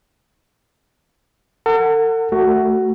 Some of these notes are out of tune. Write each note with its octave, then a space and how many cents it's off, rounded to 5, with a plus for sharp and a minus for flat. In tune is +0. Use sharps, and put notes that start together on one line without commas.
A4 +45 F#5 +0
A3 +0 F#4 +15